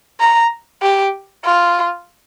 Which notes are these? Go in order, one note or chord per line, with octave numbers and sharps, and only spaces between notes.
A#5
G4
F4